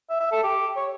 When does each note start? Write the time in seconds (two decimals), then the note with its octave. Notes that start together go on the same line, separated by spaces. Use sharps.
0.09 E5
0.20 E5
0.32 A4
0.43 G4
0.76 C#5